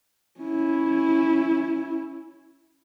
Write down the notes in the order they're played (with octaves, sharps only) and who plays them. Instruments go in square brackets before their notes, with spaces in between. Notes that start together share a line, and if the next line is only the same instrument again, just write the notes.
[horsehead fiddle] C#4 E4